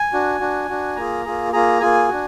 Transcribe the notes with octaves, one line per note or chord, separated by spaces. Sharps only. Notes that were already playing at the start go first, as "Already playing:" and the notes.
Already playing: G#5
D4 F#4
D4 F#4
D4 F#4
A#3 F4 G#4 A#5
A#3 F4 G#4
A#3 F4 G#4 A#5
A#3 F4 G#4 G#5
D4 F#4